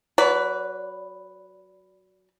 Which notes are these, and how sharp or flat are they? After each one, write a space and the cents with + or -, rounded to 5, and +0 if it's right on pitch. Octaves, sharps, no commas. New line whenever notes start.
F#3 +0 B4 +0 D5 -35